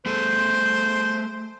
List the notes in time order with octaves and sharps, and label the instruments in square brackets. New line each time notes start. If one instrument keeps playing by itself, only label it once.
[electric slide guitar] A3 G#4 A4 [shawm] C5